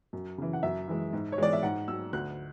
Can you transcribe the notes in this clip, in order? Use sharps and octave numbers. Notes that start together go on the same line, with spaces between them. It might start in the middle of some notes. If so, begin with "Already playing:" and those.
F#2
C#3 E3
F#5
F#2 E5
E3 G#3
G#2
C#5
E3 G#3 D5
E5
G#2 F#5
F#3 E6
D2 F#6